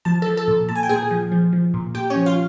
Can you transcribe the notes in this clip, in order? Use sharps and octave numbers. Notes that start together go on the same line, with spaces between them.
F3 A5
F3 A4 A5
A4 A5
A#2
A#2 A5
G#5
G5
A#2 G#4 G#5
F3
F3
F3
A#2
A#2 G4 G5
C#4 C#5
F3
F4 F5